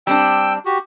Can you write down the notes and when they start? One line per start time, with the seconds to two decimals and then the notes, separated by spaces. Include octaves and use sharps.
0.07 G3 C4 D4 G5 E6
0.65 F#4 G4